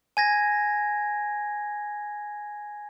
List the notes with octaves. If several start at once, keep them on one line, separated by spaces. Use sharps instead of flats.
G#5 G#6 A#6